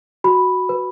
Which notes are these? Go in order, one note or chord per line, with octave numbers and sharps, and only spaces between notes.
F#4 B5
B4